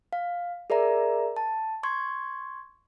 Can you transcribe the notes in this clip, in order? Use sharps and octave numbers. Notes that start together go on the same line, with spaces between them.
F5
G#4 A#4 D5 E5 A#5
A5
C6 C#6 G#6